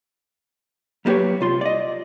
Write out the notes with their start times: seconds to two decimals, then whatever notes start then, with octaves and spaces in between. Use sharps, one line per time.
1.05 F#3 G3 A#3 G4 B4 C#5
1.41 C2 F4 C6
1.61 D5 D#5